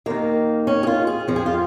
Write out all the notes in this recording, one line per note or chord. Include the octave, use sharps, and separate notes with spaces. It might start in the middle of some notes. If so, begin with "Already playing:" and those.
D#2 D#3 A#3
C#4
G#4
F4
G#4
F2 F3
G#4
F4